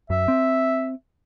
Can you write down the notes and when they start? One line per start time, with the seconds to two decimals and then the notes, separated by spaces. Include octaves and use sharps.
0.10 F#2 E5
0.28 C4